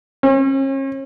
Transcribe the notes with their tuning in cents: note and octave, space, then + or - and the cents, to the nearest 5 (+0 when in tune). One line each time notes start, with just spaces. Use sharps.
C#4 -40